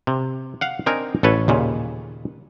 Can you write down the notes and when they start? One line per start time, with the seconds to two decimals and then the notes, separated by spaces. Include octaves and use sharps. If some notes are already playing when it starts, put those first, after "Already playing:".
0.07 C3
0.61 F5 F#5
0.86 C4 D4 D#4 A#4 G#5
1.23 A1 A4 B4 C#5
1.48 D#2 A#2 C#3